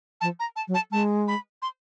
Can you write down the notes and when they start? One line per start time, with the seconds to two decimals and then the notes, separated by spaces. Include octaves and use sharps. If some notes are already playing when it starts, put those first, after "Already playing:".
0.21 F3 A5
0.40 A#5
0.56 A5
0.68 F#3
0.74 A5
0.92 G#3 A5
1.28 B5
1.62 C6